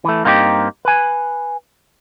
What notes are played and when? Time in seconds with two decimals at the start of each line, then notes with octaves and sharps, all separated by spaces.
0.05 E3 A3
0.24 G2 A#3 C4 D#4 F4 G4
0.85 B4 G#5